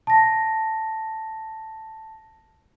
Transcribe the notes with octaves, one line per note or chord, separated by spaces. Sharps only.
A5 A#6